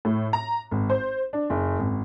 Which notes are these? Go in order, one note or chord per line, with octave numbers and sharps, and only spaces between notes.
A2
A#5
G#1
C5
D4
F#1
G#1